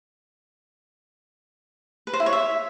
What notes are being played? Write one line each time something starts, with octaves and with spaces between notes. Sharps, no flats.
B4
C5
E4
C#5
E5